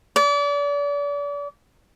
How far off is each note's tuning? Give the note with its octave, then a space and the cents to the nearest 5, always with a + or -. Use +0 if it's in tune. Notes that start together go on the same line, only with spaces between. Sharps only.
D5 -35